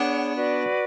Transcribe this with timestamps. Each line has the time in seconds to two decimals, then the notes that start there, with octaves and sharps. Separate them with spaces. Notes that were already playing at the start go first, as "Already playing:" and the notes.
Already playing: B3 D4 G#4 C#5 F#5
0.34 F#4 B4 D5